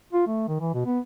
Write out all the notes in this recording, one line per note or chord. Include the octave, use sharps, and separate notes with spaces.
F4
A3
D#3
E3
B2
B3